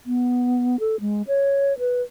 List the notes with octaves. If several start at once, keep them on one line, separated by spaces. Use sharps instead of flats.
B3
A4
G#3
C#5
B4